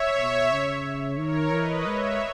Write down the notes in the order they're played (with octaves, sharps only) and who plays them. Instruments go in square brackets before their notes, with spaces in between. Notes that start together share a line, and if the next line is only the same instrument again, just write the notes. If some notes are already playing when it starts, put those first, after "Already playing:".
Already playing: [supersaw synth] C#5 E5
[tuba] B2
C#3
[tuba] D#3 [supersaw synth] A#4 C#5
[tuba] E3 [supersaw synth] B4 D#5
[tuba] G#3 [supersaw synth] C#5 E5